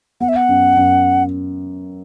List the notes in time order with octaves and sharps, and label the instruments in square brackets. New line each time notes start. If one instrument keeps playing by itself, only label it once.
[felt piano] B3 [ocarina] F#5
[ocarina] E5
F#5
[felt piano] F#2
F#2